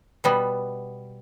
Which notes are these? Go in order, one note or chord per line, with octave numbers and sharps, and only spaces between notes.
B2 G3 B3